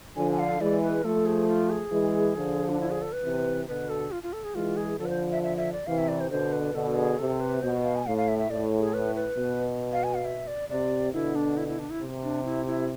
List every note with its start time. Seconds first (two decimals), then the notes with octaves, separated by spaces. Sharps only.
0.16 D3 F3 G#5
0.32 G#5
0.39 F5
0.61 E3 G#3 D5
0.82 B4
1.04 F3 A3 A4
1.26 G#4
1.48 F4
1.70 G#4
1.91 E3 G#3
2.36 D3 F3
2.69 D4
2.80 E4
2.90 G#4
3.02 A4
3.13 B4
3.23 C3 E3
3.67 B2 D3 B4
3.89 A4
4.11 F4
4.23 F4
4.33 A4
4.44 G#4
4.55 E3 G#3 F4
4.77 G#4
4.99 D3 F3 A4
5.05 B4
5.10 C5
5.32 E5
5.43 E5
5.57 E5
5.73 D5
5.87 C3 E3 F5
5.98 E5
6.08 D5
6.20 C5
6.31 B2 D3 C5
6.53 B4
6.74 B2 D3 A4
6.96 G#4
7.18 C3 A4
7.40 B4
7.62 B2 C5
7.84 F5
7.96 G#5
8.06 A2 F5
8.17 F5
8.28 E5
8.39 E5
8.50 A2 D5
8.79 G#4
8.94 B4
9.16 B4
9.38 B2
9.92 F5
10.04 G#5
10.14 F5
10.25 E5
10.47 D5
10.70 C3 D5
11.13 B2 D3 E4
11.35 D4
11.57 E4
11.68 E4
11.79 D4
11.90 E4
12.01 C3
12.23 D4
12.45 E4
12.66 E4